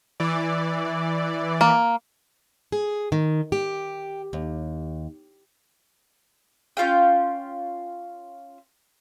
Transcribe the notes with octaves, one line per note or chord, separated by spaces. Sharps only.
E3 D5
A#3
G#4
D#3
G4
D#2
C#4 F4 F5 G5